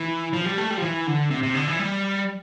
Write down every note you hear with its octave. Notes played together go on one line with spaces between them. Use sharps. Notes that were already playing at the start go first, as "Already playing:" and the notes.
Already playing: E3
F3
G3
A3
G3
F3
E3
D3
C3
C3
D3
E3
G3